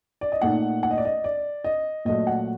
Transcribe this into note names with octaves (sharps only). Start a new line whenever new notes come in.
D5
D#5
A#2 A3 D#4 F#5
F#5
D#5
D5
D#5
D5
D#5
A#2 F#3 A3 D#5
F#5